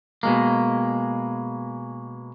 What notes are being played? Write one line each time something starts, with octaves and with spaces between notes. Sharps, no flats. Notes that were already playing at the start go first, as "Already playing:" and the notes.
B2 G#3 A#3